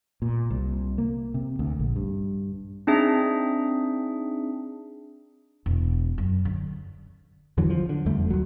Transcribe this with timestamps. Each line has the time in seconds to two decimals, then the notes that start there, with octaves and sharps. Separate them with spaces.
0.22 A#2
0.50 C2
0.98 A#3
1.34 C3
1.59 D2
1.79 A#1
1.96 G2
2.87 C4 D4 D#4 G#4 E5
5.66 E1
6.18 F#2
6.45 D3
7.57 E2 D3 E3 F#3
7.70 F3
7.89 D3
8.06 F1 E2 G3 A3
8.30 D#2 F#3